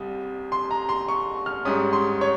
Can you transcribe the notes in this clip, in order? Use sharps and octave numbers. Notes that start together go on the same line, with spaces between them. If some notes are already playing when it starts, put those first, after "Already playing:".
Already playing: C2 C3 G3 D#6
C6
A#5
C6
C#6
F6
G#2 G3 C#4 D#6
C6
C#5